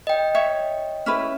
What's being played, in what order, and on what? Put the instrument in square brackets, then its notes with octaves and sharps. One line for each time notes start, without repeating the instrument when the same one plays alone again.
[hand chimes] D#5 G5
[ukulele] C#5 E5
C#4 E4 B4